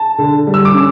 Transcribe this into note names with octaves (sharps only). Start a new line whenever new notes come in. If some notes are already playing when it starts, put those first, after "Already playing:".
Already playing: A5
D3
G3
E6
D6
C#4